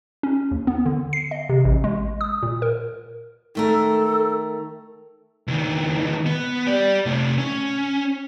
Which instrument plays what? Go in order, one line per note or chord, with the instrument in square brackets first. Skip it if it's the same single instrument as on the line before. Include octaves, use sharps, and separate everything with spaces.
[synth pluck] C#4
D#2
B3
D3
C7
D#5
C3
A1
G#3
D#6
A#2
A#4
[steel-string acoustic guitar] D#3 A3 A#4 [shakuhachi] A4
[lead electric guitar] C#2 D#3
B3
G4 D5
C3 A3
C#4